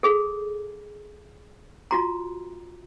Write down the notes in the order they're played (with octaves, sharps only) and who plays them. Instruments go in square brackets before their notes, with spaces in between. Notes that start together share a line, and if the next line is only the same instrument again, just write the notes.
[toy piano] G#4 A4
F4 F#4 A#5